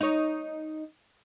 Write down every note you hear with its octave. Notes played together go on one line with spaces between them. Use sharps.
D#4 C#5